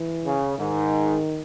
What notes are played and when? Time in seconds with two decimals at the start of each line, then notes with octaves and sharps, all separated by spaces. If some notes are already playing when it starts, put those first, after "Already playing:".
Already playing: E3
0.26 C#3
0.59 G#2 D#3